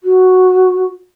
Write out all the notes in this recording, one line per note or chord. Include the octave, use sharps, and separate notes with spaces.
F#4